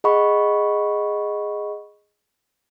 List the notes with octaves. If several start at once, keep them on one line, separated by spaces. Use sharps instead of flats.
G#4 D#5 F#5 B5 C#6